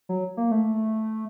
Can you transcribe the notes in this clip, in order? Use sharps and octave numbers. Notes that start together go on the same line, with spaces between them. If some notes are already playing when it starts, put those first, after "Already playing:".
F#3
A#3
A3